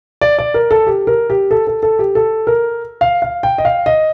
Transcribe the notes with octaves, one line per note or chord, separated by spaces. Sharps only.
D5
D5
A#4
A4
G4
A#4
G4
A4
A4
A4
G4
A4
A#4
F5
F5
G5
D#5
F5
D#5